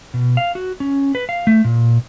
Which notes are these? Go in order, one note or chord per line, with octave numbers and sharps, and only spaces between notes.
B2
F5
F#4
C#4
B4
F5
A3
A#2